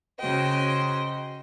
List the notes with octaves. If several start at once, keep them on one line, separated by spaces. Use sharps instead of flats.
C#3 F#4 C5 D#5 G5